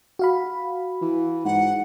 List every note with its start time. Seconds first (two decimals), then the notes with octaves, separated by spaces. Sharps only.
0.19 F#4 F5 B5
1.01 E3
1.45 G#2 F#5